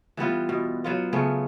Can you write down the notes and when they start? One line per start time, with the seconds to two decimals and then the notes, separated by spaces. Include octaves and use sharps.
0.17 E3 G3 B3 F4
0.49 B2
0.84 F#3 B3 F4
1.13 C#3 A3 B3 C#4